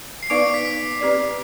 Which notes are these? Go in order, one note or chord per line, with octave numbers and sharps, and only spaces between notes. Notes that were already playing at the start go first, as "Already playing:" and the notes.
C7
B3 D#4 B4 D5 F5 D6 D7
C7
B6
B6
C4 G4 B4 D5